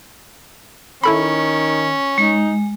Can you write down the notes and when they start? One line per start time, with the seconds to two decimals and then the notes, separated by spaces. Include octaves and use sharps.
1.04 D#3 C#4 E4 A4 B5
2.18 G#3 D#4